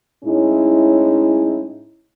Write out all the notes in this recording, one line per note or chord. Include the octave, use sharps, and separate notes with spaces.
A2 G#3 C#4 D#4 E4